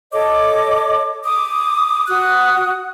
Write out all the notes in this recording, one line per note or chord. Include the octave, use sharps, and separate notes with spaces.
A4 C#5 D#5 D6
D6 D#6
F#4 D#6 F#6